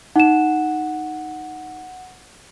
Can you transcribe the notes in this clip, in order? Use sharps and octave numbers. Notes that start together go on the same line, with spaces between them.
D#4 F#5 E7